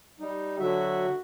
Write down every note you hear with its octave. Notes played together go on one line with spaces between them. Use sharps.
G3 D#4
D3 F#3 F#4 E5